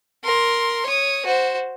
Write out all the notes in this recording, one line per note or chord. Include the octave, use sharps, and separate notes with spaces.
A#4 C6
C#5 D#6
F#4 C5